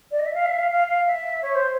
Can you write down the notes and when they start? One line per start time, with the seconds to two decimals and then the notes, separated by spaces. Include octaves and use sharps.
0.11 D5
0.19 D#5
0.26 E5
0.34 F5
0.46 E5
0.59 F5
0.70 F5
0.88 F5
1.06 E5
1.42 C#5
1.55 C5